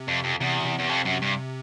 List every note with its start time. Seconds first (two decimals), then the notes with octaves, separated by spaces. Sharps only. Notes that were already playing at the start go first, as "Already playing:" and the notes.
Already playing: C3
0.08 F2
0.24 F2
0.40 E2 C3
0.60 B2
0.65 C3
0.79 E2
0.89 F2
1.05 F#2
1.22 G2